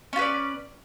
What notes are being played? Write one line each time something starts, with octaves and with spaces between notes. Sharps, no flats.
C#4 F4 B4 D5